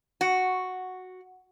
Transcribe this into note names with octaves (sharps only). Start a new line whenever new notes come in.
F#4